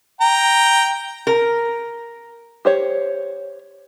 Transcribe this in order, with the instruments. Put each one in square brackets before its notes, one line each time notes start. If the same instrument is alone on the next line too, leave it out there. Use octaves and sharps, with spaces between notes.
[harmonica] G5 A#5
[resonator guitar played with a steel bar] A#4
[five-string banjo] G4 C5 C#5